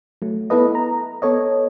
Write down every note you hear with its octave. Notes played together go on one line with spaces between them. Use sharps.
F#3 A3
B3 E4 A4 B4 D#5
A#5
B3 A4 C#5 D#5